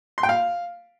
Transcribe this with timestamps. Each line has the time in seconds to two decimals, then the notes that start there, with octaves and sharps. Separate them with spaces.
0.18 C6
0.23 G5
0.29 F5